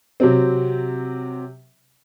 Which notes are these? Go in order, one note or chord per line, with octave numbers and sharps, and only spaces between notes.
C3 F#3 C4